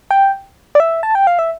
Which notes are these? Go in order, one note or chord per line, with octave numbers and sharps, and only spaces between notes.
G5
D5
E5
A5
G5
F5
E5